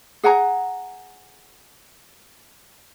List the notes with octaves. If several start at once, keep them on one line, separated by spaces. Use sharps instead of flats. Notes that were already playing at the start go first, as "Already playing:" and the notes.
G#4 F#5 G#5 A#5